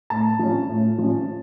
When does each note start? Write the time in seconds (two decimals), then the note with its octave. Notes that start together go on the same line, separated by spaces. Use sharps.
0.10 A2 A5
0.39 F3 C#4
0.69 A2
0.98 F3 C#4